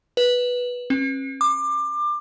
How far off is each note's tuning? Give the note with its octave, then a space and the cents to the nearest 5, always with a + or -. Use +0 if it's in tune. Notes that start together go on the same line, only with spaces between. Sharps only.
B4 -10
C#4 -45
D6 +25